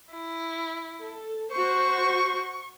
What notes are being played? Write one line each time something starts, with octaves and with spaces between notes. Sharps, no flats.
E4
A4
F#4 C5 C#6